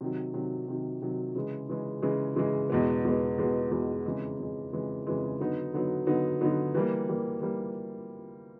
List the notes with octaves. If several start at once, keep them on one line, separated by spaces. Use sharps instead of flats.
C3 D#3 F#3
C3 D#3 F#3
C3 D#3 F#3
C3 D#3 F#3
C#3 E3 G#3
C#3 E3 G#3
C#3 E3 G#3
C#3 E3 G#3
E2 B2 G#3 B3
E2 B2 G#3 B3
E2 B2 G#3 B3
E2 B2 G#3 B3
F2 C#3 E3 G#3
F2 C#3 E3 G#3
F2 C#3 E3 G#3
F2 C#3 E3 G#3
D3 F#3 B3 D#4
D3 F#3 B3 D#4
D3 F#3 B3 D#4
D3 F#3 B3 D#4
E3 G3 A#3
E3 G3 A#3
E3 G3 A#3